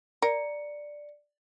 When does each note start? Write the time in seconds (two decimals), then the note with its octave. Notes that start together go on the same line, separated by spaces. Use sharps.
0.22 A#4 D5 C#7